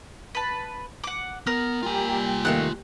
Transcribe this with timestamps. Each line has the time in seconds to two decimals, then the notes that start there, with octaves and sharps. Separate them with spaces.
0.35 B4 A5
1.04 F#5 D6
1.47 B3 A#4 F6
1.83 G3 A#3 F4 G4 G#5
2.45 D#2 A3 A#3 F#6